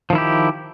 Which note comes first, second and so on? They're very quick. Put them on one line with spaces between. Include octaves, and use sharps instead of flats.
F3 D#3 E4 G4